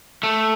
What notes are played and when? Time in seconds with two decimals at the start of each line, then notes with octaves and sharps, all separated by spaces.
0.23 A3